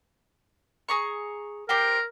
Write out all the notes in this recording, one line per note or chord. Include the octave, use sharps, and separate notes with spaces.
G#4 A#5 C#6
G4 A#4 C5 G5